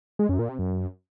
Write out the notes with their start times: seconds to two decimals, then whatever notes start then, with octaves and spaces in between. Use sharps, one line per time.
0.19 G#3
0.29 F#2
0.39 A#2
0.49 C3
0.59 F#2